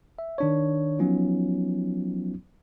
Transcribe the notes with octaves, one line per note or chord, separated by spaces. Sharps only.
E5
D#3 D4 C#5
F3 F#3 B3 C#4 D#4 F4